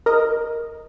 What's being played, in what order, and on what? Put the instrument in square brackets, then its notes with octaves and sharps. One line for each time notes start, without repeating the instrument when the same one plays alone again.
[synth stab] A#4 D#5